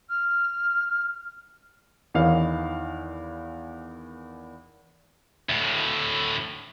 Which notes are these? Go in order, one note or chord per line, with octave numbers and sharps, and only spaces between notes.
F6
E2 D#3 E3 D#4 C#5 F5
D2 A2